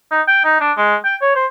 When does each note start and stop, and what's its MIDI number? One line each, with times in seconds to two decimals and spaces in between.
0.12 0.21 63
0.28 0.41 79
0.45 0.57 63
0.61 0.72 62
0.77 0.96 56
1.05 1.16 79
1.21 1.35 73
1.36 1.46 72